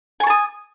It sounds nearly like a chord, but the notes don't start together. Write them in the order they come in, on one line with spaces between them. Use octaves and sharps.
G#5 C#6 A5 D#6